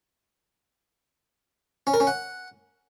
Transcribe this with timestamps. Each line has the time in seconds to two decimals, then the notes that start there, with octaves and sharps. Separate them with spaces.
1.87 C#4
1.94 A#4
2.00 C#4
2.07 F#5